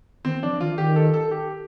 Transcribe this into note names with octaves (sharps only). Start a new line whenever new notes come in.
D#3 C4
F3 D4
D#3 F4
D#3 G4
A4
A4
G4